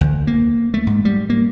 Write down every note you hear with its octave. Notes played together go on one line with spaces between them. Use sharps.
D2
A#3
A3
G#2
G3
A#3